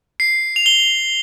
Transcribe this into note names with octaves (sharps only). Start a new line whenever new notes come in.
C7
F7
G7